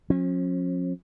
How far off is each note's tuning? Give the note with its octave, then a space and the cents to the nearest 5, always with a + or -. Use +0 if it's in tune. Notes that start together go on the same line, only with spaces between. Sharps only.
F3 +40 C#4 -40